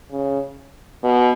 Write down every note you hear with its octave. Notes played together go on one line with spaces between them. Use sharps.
C#3
B2